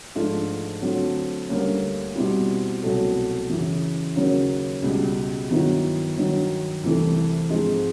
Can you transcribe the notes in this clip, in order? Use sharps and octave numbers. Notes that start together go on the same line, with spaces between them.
G#2 F3 A3 D4 F4
D3 F#3 A3 C4 F4
D2 D3 G3 A#3 C#4
B2 G3 C4 E4
C2 B2 F#3 A3
F#2 C#3 E3
D#2 C#3 F#3 A#3 C#4
C#2 B2 G3
G2 D#3 F#3 B3 E4
G2 D#3 F#3
C2 C3 E3 A3
G#2 F3 G#3 C4 D#4